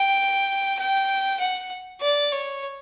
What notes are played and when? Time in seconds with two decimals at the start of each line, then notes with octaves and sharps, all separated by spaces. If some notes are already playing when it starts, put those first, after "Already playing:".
Already playing: G5
0.79 G5
1.40 F#5
2.01 D5
2.32 C#5